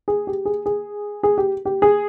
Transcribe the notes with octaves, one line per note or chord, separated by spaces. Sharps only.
G#4
G4
G#4
G#4
G#4
G4
G4
G#4